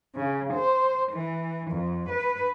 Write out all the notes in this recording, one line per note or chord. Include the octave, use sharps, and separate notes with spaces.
C#3
C5
E3
F2
B4